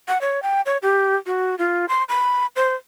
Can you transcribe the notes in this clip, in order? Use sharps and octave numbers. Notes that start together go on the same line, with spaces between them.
F#5
C#5
G5
C#5
G4
F#4
F4
C6
B5
C5